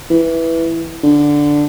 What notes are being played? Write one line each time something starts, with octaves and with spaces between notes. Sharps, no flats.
E3
D3